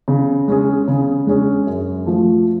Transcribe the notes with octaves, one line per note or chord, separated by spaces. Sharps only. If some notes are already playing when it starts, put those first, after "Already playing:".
C#3
G#3 C#4 G#4
C#3
G#3 C#4 G#4
F#2
F3 A3